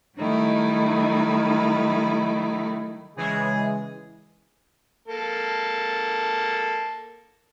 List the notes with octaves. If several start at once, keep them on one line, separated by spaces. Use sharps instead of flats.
D#3 F#3 G3 A3 D#4 E4
C#3 E3 G#3 G#4
A#3 A4